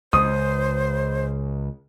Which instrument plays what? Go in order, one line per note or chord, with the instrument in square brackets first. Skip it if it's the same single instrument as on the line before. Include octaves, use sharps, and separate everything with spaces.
[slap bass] C#2 [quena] C5 [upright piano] D#6